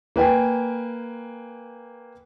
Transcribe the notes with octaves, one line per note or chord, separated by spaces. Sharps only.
A#3 B4 G5 G#5